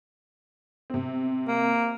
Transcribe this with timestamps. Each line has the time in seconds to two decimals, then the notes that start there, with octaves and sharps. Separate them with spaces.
0.90 C3 C4
1.48 A#3